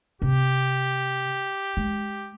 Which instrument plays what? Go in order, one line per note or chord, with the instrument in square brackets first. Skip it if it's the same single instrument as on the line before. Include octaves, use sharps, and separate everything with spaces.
[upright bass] C3 [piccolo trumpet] G4
[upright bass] G#3